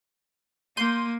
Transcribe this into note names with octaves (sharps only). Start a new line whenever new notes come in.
A#3 C6 G6 D#7